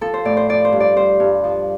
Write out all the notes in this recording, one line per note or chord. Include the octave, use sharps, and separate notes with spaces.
F3 A4
C5
A2 D5
C5
F3 D5
C5
G2
D5
G3 C5
G2
F3